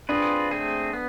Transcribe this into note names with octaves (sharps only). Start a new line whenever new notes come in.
C4 D4 F4 G#4 B4
A3 C4 G#4
B3